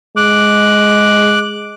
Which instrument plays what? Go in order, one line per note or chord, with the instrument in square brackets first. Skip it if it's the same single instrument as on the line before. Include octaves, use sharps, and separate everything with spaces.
[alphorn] G#3 [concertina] D6 F#6